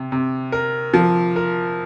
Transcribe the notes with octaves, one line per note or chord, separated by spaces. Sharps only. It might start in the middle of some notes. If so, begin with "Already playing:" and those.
Already playing: C3
C3
A#4
F3
A#4